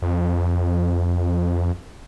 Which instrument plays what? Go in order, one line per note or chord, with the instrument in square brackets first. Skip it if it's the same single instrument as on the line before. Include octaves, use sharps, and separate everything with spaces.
[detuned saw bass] F2